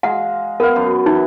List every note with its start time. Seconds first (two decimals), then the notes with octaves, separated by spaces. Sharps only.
0.03 G#3 F5 F#5 A#5
0.60 B3 A#4 F5
0.76 F#2
1.06 E3 D#4